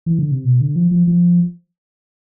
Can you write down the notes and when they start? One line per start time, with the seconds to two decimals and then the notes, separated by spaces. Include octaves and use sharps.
0.06 E3
0.19 D3
0.31 C3
0.44 B2
0.61 D3
0.76 F3
0.91 F3
1.07 F3